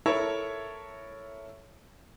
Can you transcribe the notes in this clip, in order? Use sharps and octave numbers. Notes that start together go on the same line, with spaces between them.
E4 A4 A#4 C#5 E5 A5